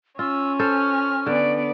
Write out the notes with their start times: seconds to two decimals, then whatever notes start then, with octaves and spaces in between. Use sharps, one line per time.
0.19 C#4 F4 E6
0.59 A4 C5 F6
1.26 D3 B3 D5